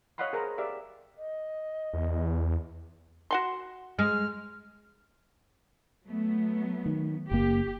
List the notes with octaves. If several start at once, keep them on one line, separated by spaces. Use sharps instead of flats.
C#5 D#5 F5 F#5 B5 C6
G#4 A#4 C5 A#5
G4 A#4 D5 E5 F5
D#5
E2
F#4 F#5 C6
G#3 F6
F#3 A3 B3
D#3
F#1 A#3 G4